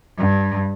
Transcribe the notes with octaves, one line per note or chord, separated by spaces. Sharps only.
G2